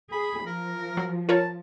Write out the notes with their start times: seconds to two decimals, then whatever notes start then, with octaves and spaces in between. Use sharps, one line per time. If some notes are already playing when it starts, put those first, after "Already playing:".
0.12 G#4 B5
0.47 F3 A#4
0.97 F#3
1.29 F4 A#4 C#5 A5